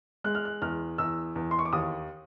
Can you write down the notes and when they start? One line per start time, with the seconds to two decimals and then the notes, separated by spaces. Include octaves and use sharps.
0.24 G#3 F#6
0.35 F6
0.45 F#6
0.62 E2 F6
0.98 E2 E6
1.35 E2
1.51 C6
1.59 C#6
1.65 D6
1.73 D#2 D#6